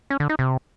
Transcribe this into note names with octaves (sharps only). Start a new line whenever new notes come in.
C#4
D3
D#4
C3